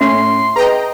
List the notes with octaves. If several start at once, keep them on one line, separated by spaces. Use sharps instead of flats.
A2 C#4 E5 C6
G#4 B4 D#5 G5 A5 A#5